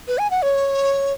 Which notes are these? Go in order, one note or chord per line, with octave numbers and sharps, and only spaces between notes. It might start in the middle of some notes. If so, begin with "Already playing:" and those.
B4
G#5
F#5
C#5